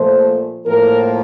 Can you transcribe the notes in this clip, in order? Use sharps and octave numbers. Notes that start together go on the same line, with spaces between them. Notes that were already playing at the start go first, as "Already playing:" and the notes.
Already playing: A#2 F3 A3 C5
A2 F3 A#3 A#4